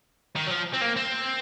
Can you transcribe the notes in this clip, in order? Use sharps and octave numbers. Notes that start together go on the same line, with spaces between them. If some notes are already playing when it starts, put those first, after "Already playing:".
D#3
F#3
F3
C4
A#3
C4